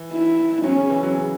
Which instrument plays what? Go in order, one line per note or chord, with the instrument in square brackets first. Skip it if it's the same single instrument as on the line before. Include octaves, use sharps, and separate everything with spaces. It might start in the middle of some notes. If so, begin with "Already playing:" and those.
Already playing: [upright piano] E3
[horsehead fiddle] E4
[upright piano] F#3 [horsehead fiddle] C#4
[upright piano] C#3
E3
F#3
C#3